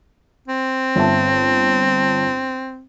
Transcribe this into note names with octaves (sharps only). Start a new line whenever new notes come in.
C4
G1 E5 A5